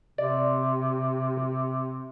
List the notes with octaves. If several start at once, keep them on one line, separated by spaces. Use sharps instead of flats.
C3 D5